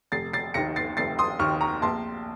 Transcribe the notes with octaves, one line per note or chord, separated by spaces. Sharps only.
F1 A6 C7
A6 C7
D#2 D#3 A#6 C#7
A6 C7
F1 A6 C7
C6 D#6
D#2 D#3 C#6 F6
A#5 C#6
A#1 A5 C6